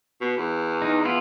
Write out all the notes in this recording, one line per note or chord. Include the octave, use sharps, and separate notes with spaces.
B2
E2
D#4
B3 E4 F4